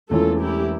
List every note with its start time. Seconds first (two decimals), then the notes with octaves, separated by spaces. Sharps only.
0.10 E1 E2 E3 A3 C#4 F4 A4
0.41 E4 G4